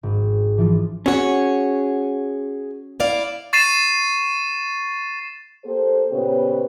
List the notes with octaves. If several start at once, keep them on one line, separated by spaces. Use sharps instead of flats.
G#1
E3 F3 D4 F4
C#4 F#4 G#4 C#5
E4 D5 F5
C#6 A6 C7 D#7 E7
A#3 G4 A4 C5
A#2 C#3 B3 G4 B4 C5